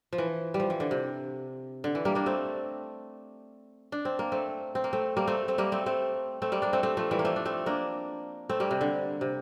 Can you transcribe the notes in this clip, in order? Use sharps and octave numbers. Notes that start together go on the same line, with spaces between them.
F3
E3
G3
F3
E3
D3
C3
D3
E3
G3 A#3
A#3 D4
A3 C4
D4
C4
A#3
A3 C4
C4
A#3
A3 C4
G3 A#3
A3 C4
A3 C4
G3 A#3
A3 C4
A3 C4
A3 C4
G3 A#3
A#3 D4
A3 C4
A3 C4
F3 A3
E3 G3
A#3
F3 A3
D4
A3 C4
A#3 D4
A3 C4
G3 A#3
C3
D3
C3